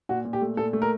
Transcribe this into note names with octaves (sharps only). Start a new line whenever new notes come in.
A#2 F#4
A#2
G4
A3
A#2 A4
A3
A#4